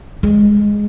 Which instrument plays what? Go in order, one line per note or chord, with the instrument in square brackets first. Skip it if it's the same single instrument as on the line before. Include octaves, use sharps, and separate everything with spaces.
[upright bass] G#3